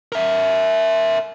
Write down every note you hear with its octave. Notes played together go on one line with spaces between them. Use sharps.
A#4 E5